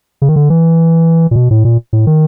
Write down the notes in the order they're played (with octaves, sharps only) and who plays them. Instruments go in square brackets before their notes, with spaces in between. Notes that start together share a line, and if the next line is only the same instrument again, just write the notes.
[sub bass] C#3
D#3
D3
E3
A#2
B2
A2
A#2
A2
D#3